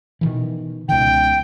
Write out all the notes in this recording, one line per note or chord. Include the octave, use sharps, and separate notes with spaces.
B2 D#3 E3
C#2 B2 D#3 G5